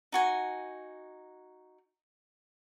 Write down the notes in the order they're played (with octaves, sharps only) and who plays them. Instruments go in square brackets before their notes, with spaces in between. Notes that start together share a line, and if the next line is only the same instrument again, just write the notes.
[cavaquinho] D#4 F#4 G#5